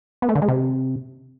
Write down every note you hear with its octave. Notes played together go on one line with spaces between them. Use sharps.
B3
A3
D3
G#3
C3